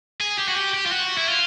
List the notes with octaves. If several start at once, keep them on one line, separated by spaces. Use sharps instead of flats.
G#4
G4
F#4
G4
G4
F4
F#4
E4
F4